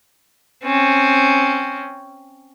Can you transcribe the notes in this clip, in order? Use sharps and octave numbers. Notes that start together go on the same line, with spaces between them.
C4 C#4